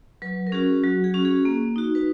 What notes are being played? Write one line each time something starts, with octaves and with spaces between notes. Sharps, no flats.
F#3 B4
A#4
C#4 F#4 G#4
F#3 F#4
G#4
C#4 F#4
G#4
A#3
D#4 F#4
B4